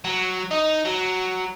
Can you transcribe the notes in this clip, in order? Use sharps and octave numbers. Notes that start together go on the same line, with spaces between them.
F#3
D#4
F#3